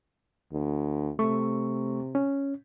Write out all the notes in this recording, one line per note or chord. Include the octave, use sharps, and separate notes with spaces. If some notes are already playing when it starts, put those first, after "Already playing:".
D2
C3 A3 C#6
C#4